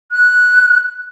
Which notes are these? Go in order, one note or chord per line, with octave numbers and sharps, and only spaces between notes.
F#6